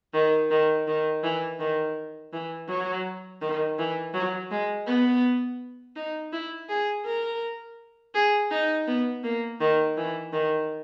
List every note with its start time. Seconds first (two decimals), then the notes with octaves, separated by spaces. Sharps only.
0.14 D#3
0.51 D#3
0.87 D#3
1.23 E3
1.60 D#3
2.33 E3
2.69 F#3
3.42 D#3
3.79 E3
4.14 F#3
4.51 G#3
4.87 B3
5.96 D#4
6.33 E4
6.69 G#4
7.06 A#4
8.15 G#4
8.51 D#4
8.87 B3
9.24 A#3
9.61 D#3
9.97 E3
10.33 D#3